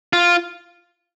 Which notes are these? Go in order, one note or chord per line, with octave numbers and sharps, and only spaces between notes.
F4